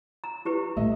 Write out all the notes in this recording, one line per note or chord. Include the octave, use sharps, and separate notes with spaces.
A#5
E4 G4 B4
A#2 G#3 A3 D#5 E5